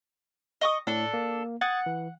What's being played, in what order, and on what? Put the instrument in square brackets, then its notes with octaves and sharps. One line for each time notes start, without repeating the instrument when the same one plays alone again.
[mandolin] D#5 C#6 D#6
[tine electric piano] A2 [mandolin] D4 A4
[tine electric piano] A#3
[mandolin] F#5 [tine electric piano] D#6 G#6 A6
[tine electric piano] E3